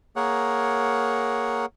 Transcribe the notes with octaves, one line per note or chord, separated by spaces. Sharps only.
A#3 G#4 A#4 C#5 F#5